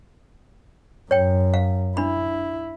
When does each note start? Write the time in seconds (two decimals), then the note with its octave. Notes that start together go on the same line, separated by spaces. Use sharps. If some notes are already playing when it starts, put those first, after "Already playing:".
1.11 F#2 C#5 G5
1.54 F5
1.97 D4 E4 B5